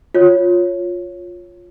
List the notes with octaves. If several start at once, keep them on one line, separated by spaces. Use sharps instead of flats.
F4 C#5